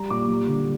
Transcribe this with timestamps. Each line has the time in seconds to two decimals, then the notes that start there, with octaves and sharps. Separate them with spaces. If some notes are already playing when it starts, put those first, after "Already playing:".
Already playing: G3 A#5
0.10 A#2 D6
0.28 G3
0.47 D3